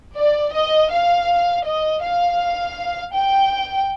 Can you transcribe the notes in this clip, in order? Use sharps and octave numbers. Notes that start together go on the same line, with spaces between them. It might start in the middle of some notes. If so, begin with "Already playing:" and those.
D5
D#5
F5
D#5
F5
G5